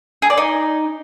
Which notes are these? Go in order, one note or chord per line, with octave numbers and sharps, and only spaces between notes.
G#4
D5
D#4